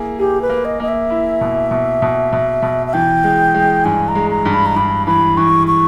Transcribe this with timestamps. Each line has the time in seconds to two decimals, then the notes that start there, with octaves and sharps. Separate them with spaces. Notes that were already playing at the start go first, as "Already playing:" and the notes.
Already playing: A#3 E4 G#4
0.19 G4 G#4
0.42 B4
0.50 A#3
0.65 D#5
0.80 A#3 D#5
0.88 E5
1.10 E4
1.41 B2
1.71 B2
2.02 B2
2.33 B2
2.62 B2
2.87 E5
2.93 E3 G5
3.24 G#3
3.54 G#3
3.84 G2 G#5
4.08 A#5
4.15 G#3
4.31 A#5
4.45 G2
4.54 B5
4.66 A#5
4.76 G2 B5
5.07 E3 B5
5.37 E3 C#6
5.68 C#6